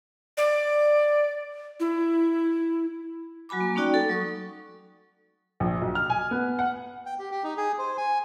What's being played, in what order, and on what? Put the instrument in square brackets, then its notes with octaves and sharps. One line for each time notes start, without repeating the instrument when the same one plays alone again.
[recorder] D5
E4
[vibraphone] F#3 F#4 G#5 B5 D6
A#3
A3 C#4 D#4 F#4 D5 G5
A4
F#3 C#6 D#6
[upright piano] A#1
B1
F6
G#5
B3
F#5
[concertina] G5
G4
G4
D#4
G#4
C5
G#5